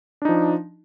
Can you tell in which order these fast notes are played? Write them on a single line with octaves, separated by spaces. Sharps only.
D4 D#4 F3